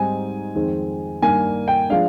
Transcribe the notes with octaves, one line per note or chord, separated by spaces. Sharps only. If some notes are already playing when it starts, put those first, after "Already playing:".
Already playing: G#2 G3 C4 D#4 G#5
F2 D#3 G#3 C4
G2 D#3 A#3 D4 G#5
G5
F3 G#3 D4 F5